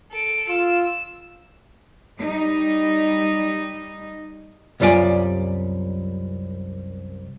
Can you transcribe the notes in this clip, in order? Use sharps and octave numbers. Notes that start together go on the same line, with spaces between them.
A4 D7
F4 E6
G3 D#4
C2 F#2 G3 F4 D5 G#5